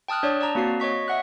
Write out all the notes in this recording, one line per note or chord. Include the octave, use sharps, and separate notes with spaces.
G5 A5 D#6 F6 F#6
D4 C#5 D5
D5 A5 A#5
A#3 C4 F#4 F5 C7
C#5 D#5 C#6 B6
E5 F#5 F#6